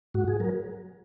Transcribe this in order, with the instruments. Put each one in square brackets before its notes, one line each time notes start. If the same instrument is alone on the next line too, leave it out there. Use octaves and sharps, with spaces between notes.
[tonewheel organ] G#2 F#4
G#4
F#3 A#4